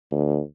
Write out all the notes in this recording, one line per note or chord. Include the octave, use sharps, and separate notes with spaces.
D2